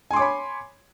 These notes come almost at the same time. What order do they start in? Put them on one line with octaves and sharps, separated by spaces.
G#5 C6 D6 C#5 B5